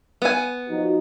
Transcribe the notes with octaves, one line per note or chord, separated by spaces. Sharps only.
B3 G#5
F3 D#4 F#4